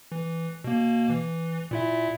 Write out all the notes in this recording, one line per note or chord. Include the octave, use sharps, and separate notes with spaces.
E3
B2 A#3
E3
A#2 E4 E5